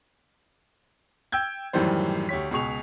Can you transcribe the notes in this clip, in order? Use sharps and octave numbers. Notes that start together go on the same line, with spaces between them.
G5 E6 G6 G#6
F#2 A2 D#3 E3 G3 C5
D2 G4 C#5 B6
C#2 B2 G#4 C#6 F7